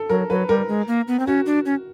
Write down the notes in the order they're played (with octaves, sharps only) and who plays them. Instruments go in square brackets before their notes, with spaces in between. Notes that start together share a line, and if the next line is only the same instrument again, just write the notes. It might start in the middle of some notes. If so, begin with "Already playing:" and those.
Already playing: [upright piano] A4
[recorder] F#3 [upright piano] A#4
[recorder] F#3 [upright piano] B4
[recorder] G3 [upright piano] A#4
[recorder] G#3
A#3
B3
C4
[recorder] C#4 [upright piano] F#4
[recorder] D4
C#4